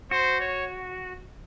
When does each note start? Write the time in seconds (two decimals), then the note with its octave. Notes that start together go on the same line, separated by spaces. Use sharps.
0.11 F#4 C5
0.40 C#5